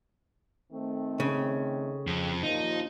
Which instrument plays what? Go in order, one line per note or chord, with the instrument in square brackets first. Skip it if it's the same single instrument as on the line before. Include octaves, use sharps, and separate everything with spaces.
[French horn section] D#3 A3 C4
[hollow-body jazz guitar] C#3
[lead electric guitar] F2
[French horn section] D#2 A#2 F3 [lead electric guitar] D#4